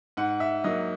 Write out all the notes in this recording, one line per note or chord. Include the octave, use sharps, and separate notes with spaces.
G#2 F#5
E5
F#3 A#3 D#5